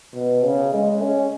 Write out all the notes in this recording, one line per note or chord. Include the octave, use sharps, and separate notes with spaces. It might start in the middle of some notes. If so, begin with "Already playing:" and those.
B2
C#3
G#3
C#4